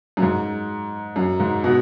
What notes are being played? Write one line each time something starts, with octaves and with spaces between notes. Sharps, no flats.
F#2
G#2
F#2
G#2
B2